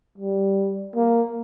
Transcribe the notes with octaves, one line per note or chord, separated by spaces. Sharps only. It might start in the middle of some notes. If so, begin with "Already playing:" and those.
G3
A#3